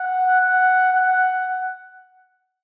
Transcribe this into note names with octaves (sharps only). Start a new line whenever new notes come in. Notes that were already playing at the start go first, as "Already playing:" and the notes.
Already playing: F#5
F#5
F#5